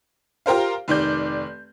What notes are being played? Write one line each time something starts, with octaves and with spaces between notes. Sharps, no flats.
F4 G4 A#4 C5 F5
F1 D#3 D5 G6